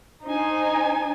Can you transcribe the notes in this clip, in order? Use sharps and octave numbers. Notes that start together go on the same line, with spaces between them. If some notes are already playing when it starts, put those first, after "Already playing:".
D4 D#4 C5 G#5